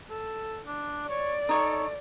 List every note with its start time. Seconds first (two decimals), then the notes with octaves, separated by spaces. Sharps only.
0.10 A4
0.66 D4
1.09 C#5 D5
1.49 D#4 A4 C#5 C#6